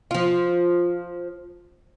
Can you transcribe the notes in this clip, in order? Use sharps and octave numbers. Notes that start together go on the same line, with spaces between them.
F3 F4